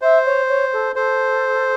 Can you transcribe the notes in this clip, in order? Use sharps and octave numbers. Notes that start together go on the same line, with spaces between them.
C5 E5
C#5
C#5
A4
A4 C5